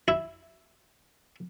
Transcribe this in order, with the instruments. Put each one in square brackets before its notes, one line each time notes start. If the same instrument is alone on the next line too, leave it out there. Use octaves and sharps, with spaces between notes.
[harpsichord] E4